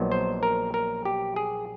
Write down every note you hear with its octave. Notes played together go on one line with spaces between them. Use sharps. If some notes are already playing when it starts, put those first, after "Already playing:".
Already playing: A#1 A#2 F#3 B3 D#4
C5
A#4
A#4
G4
G#4